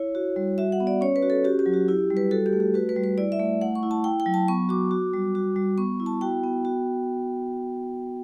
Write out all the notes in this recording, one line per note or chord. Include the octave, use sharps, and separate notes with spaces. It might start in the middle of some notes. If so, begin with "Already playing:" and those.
Already playing: E4 C#5
F#4
G3
F#4 E5
F#5
B3
D5
C#4 C#5
B4
F#4
A4
F#4 G4
G4
F#3
F#4
E4 G4
G3
B4
F#4 A4
G4
A3
G4
F#4 B4
B4
G3
B4
E4 D5
E5
A3
A3 F#5
C#6
E4
A5
E4 G5
G5
F#3
A5
B3 C#6
F#4 D6
F#4
G3
F#4
G3
B3 C#6
E4
A5
F#4 G5
B3
F#4